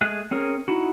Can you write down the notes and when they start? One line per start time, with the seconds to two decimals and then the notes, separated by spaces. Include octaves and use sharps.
0.01 G#3 A3 G#4 F#6
0.31 C4 C#4 G#4 A#4
0.68 D#4 E4 F#4